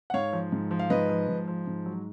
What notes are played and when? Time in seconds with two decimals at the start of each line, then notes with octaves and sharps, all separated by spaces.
0.10 F#5
0.14 G#2 C#5 F5
0.33 F3
0.52 G#2
0.71 F3
0.79 F5
0.90 G#2 B4 D#5
1.09 F3
1.28 G#2
1.48 F3
1.67 G#2
1.86 F#3